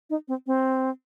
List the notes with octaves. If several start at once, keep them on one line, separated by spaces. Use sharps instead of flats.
D#4
C4
C4